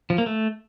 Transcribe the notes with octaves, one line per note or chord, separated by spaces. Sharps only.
F3
A#3
A3